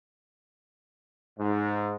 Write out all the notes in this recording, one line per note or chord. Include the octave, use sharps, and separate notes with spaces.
G#2